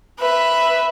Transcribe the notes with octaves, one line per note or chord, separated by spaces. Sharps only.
B4 E5